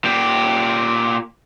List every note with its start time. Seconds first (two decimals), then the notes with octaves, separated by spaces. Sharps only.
0.04 A#2 G4